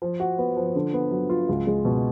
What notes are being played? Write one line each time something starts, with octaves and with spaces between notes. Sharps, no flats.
F3
F#4
B3
F3
D3
B3
F#3
F4
C#2
G#3
B2